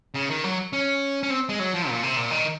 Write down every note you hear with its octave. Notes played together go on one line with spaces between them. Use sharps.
C#3
D#3
F#3
C#4
C#4
C4
G#3
F#3
F3
A#2
C3
A#2
D#3